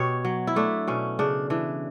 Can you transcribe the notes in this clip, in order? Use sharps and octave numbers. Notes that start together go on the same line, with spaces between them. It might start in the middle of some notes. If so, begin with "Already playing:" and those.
Already playing: B2 G4 C#5
F#3
E4
A3 D4
B2 C#4
C#3 D4
E3 D4